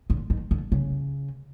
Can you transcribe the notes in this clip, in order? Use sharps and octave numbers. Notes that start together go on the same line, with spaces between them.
D3
D#3
D3
C#3